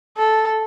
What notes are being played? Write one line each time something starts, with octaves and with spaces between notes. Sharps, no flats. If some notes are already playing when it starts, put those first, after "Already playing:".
A4